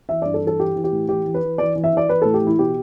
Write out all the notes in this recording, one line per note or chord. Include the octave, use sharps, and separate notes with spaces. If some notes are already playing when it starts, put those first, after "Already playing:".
E3 E5
G2 D5
A4
E3
A4
E3 G4
E3
G4
A2
E3 G4
E3
B4
E3
E3 D5
E3
E5
E3 D5
E3 B4
A2 A4
G4
E3
E4
B2 G4